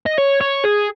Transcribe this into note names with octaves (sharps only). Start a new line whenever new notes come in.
D#5
C#5
C#5
G#4